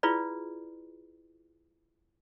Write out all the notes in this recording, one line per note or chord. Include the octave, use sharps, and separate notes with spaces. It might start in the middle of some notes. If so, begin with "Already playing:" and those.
E4 F4 G#4 B4 D5